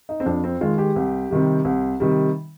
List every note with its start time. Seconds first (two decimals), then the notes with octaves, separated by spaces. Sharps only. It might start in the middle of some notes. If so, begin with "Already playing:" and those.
0.09 D#4
0.20 C4
0.26 F2 D4
0.44 C4
0.61 D#3 G#3 F4
0.78 G4
0.96 C2
1.30 C3 D#3 G3
1.65 C2
2.00 C3 D#3 G3